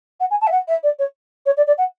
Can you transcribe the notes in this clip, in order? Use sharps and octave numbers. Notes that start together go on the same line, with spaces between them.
F#5
G#5
A5
E5
F#5
E5
D5
C#5
C#5
D5
D5
F#5